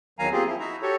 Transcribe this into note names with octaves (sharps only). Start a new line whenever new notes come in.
E2 D#3 F#3 F5 G#5 A#5
A#3 C4 F4 G4 G#4
F3 E4
D#4 E4 F#4 E5 A#5
F#4 G4 A4 C#5